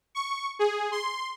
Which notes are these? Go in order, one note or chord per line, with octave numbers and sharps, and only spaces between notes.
C#6
G#4
C6